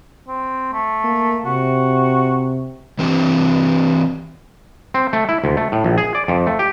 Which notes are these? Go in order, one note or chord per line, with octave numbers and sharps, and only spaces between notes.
C4
A3
A#3
C3 F#4
E3 C4 G4
C4
A3
E4
D2
A3
A2
A#1
G#4
D5
F2
A3
G4